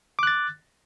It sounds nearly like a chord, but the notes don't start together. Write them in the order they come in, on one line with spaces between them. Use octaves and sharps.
D6 F#6 A6